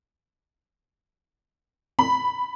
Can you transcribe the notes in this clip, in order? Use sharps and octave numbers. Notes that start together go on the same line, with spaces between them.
B5